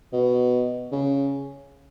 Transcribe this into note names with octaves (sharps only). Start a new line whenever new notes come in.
B2
C#3